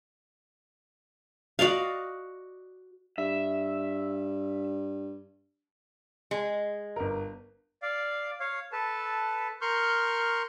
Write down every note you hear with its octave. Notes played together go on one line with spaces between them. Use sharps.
F#4 D5 D#5 F5
G2 E5
G#3
G1 A#4
D5 F5
C#5 F5
A4 B4 A5
A#4 C6 C#6 F6 G6